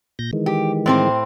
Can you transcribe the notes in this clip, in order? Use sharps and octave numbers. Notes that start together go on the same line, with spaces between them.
A#2 G6 A#6
D#3 E3 G#3
G4
A2 C4 C5